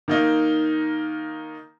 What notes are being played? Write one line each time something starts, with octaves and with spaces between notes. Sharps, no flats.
D#3 A#3 D#4